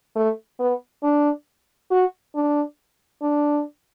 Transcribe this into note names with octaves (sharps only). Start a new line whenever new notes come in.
A3
B3
D4
F#4
D4
D4